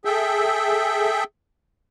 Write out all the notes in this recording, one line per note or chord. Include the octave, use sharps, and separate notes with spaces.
G#4 A4 E5 G5